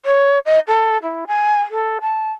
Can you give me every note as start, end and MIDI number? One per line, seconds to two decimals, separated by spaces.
0.05 0.39 73
0.46 0.59 75
0.68 0.98 69
1.03 1.24 64
1.27 1.60 80
1.71 1.98 69
2.01 2.30 81